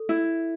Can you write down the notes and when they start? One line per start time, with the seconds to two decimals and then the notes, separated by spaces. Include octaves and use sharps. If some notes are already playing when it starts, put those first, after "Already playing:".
Already playing: A4
0.09 E4